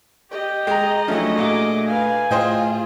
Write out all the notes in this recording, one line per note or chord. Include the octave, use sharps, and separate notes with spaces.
G4 D#5
G#3 G5 A#5
F3 F#3 A3 C#4 D4 E4
A#2 F#4 G#4 D6
B4 F5 G#5
A2 F4 G#4 C5 D#5 G5